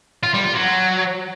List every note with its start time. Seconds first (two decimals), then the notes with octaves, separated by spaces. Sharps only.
0.23 F4
0.34 G3
0.44 F4
0.55 F#3